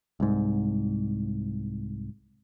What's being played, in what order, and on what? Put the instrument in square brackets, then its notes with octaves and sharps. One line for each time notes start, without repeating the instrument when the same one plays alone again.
[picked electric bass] C2 G#2